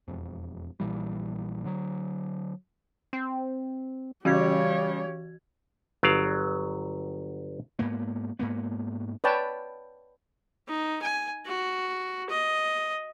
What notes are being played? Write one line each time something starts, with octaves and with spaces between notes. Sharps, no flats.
E1 F2
A#1 A#2 E3 G3
D3 F#3
C4
C#3 E3 G3 F#4 G4 C#5 G#6
G1 F#3 D5 F5
G#2 A#3 B3
G#2 A#3 B3
B4 C#5 D5 G5 A5
D#4
G#5
F#4
D#5